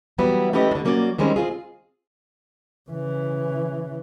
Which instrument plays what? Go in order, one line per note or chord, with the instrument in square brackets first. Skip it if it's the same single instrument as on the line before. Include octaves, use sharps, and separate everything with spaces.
[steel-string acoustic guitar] E3 F#3 G3 B3 E4
A3 C#4 E4 G4 B4 D#5
D3 D4
F#3 A#3 C#4 F#4 D5
D#3 G3 G#3 C4 C#4
C4 F4 G#4
[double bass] C#3 E3